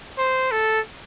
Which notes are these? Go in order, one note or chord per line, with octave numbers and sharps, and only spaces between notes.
C5
A4